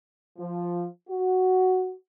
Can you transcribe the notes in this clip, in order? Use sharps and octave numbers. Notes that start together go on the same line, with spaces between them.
F3
F#4